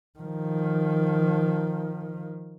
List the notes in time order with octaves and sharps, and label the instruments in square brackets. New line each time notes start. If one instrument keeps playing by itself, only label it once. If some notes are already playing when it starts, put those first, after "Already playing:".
[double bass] D#3 F3